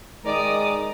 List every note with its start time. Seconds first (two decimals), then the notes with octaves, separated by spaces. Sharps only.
0.25 D#3 G#3 D5 A#5 D#6